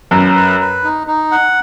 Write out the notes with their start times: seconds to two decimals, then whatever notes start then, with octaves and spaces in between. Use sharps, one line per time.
0.11 F#2 B4
0.35 B4
0.60 B4
0.84 D#4
1.07 D#4
1.31 F#5